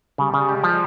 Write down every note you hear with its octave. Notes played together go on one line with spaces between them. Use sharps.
C#3 G3
C#3
G#3 G4
F3